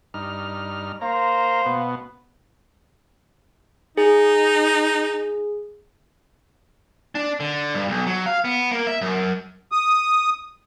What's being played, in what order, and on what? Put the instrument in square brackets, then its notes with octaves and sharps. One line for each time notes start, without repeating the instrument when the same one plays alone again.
[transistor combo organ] G2 D#4 F6
[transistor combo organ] A#3 A#5 [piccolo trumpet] C5 [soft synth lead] F5
[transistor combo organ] B2 B3
[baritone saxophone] D#4 [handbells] G#4
[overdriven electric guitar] D4
D3
G2
B1
F#3
F5
B3
A#3
E5
F#2
[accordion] D#6